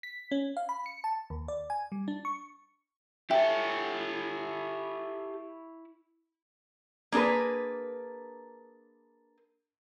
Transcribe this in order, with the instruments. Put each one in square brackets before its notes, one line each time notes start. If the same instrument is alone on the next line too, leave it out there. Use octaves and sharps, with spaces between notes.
[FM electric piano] B6
C#4
F5
B5
C#7
A5
D#2
D5
G#5
G3
D4
C#6
[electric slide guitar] E4 C#5 [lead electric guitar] G4 A4 [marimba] E5 G5
[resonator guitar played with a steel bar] A#3 D4 G#4 A#4 B4